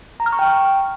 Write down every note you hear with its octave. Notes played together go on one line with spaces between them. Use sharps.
A#5
F6
C#6
G5